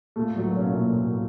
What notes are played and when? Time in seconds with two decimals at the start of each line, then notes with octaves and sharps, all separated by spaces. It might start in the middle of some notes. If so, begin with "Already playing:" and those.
0.16 A#2 A3
0.30 A2
0.36 F#3
0.42 B2
0.56 A#2 C#4
0.70 A2
0.77 A#2